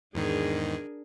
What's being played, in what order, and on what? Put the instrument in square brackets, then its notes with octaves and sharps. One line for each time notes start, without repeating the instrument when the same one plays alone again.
[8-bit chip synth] E2 G#2 D#3 [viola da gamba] D4 G#4 A#4